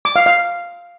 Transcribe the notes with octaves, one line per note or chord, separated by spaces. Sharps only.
D6
F5
F5